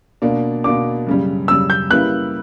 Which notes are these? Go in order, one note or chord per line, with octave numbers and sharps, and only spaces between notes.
B2 A#3 D4
B2 A#3 D4 D6
F#2 C#3 G3
F#2 C#3 G3 E6
G6
C#3 G3 A#3 E4 B4 F#6